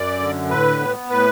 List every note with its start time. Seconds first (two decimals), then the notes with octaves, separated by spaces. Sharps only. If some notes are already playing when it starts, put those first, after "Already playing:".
Already playing: F#2 D5
0.20 D3
0.49 A2 B4
0.80 B3
1.10 A2 B4